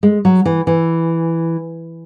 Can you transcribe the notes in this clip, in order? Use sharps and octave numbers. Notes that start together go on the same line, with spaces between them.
G#3
F#3
E3
E3